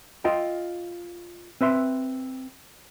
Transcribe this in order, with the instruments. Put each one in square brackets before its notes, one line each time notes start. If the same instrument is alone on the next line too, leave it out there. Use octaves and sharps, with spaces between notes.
[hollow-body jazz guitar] F4 D#5 G5
C4 B4 E5 C6